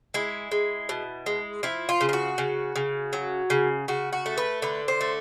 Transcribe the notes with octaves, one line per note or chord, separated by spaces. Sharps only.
G#3 E4
G#3
B2
G#3
F3 E4
F4
C#3
F4
F#4
C#3
C#3
F#3
C#3
C#3 F#4
F#4
A3
B4
D3 B4
C5
A3